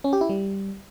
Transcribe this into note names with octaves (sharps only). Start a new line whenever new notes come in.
C#4
G4
E4
G3